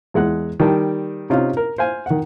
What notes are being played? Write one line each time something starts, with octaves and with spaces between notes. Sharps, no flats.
E2 G#3 F#5 F#6
D#3 G3 G5 A5
C3 C#4 D#4 F4
A#4
C5 F5 G#5
D#3 F#5